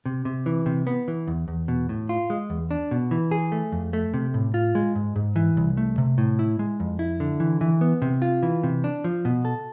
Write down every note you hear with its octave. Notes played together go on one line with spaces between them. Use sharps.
C3
C3
E3
C3
B3
E3
E2
E2
B2
A2
F4
G#3
E2
D4
B2
E3
G#4
A3
F2
A3
C3
A2
F4
G#3
G#2
G#2
E3
C2
A3
C3
A2
E4
G#3
F2
E4
D3
E3
E3
B3
C3
F4
E3
C3
D4
F3
B2
A4